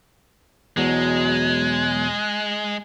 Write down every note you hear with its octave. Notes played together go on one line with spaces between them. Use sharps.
E2 B2 F#3 G#3